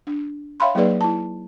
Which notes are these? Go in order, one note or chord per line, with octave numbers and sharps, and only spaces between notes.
D4
C#5 E5 F5 G5 B5 C6
F#3 A#3 D#4 G#4 B4 D5
E4 A5